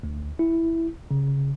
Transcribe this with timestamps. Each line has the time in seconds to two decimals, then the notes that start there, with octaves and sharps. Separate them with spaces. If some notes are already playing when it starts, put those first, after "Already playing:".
0.03 D2
0.39 E4
1.11 C#3